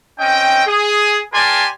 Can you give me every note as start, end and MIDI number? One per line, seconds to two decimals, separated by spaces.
0.19 0.63 60
0.19 0.63 61
0.19 0.63 75
0.19 0.63 79
0.66 1.20 68
1.33 1.66 67
1.33 1.66 70
1.33 1.66 74
1.33 1.66 80
1.33 1.66 81
1.33 1.66 84